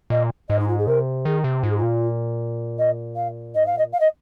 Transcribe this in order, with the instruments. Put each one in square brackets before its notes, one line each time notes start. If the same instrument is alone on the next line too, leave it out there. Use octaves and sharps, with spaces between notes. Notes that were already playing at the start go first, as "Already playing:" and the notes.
[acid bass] A#2 [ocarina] D#5
[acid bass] G#2 [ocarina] D#5
[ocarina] D#4
F4
G#4
[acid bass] C3 [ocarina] A#4
[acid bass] D#3 [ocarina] G#4
[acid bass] C3
[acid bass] G#2 [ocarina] F4
[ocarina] G#4
F4
[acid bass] A#2
[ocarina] D#5
F5
[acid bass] G#2 [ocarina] D#5
[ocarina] F5
[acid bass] A#2 [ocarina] D#5
[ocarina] F5
D#5